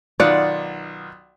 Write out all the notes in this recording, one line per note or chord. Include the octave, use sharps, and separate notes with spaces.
B1 D#3 F4 D5 F#5